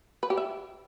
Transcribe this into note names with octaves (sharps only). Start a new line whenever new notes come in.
B4
G4
E5